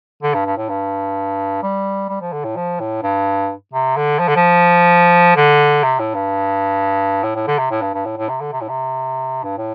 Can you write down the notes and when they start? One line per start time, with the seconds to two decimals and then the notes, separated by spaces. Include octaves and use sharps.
0.23 D3
0.34 G2
0.46 G2
0.57 A2
0.69 G2
1.63 G3
2.09 G3
2.21 F3
2.33 D3
2.44 A2
2.56 F3
2.80 A2
3.03 G2
3.73 C3
3.97 D3
4.19 F3
4.28 D3
4.36 F3
5.36 D3
5.84 C3
5.99 A2
6.15 G2
7.23 A2
7.35 A2
7.47 D3
7.59 C3
7.71 A2
7.82 G2
7.94 G2
8.05 A2
8.17 A2
8.29 C3
8.41 D3
8.52 C3
8.61 A2
8.69 C3
9.44 G2
9.58 A2